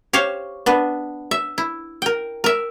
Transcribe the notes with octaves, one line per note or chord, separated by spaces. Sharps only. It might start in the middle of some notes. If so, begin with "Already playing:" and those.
G4 C5 C#5 F5
B3 D4 B4
E5
E4
A#4 G5
A#4 E5